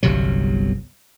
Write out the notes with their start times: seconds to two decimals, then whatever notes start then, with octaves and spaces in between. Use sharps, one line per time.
0.03 G1 C2 C3 F#3